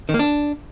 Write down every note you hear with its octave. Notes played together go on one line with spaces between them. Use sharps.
D#3
A#3
D4